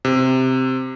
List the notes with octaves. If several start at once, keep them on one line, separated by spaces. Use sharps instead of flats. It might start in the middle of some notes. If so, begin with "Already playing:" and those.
C3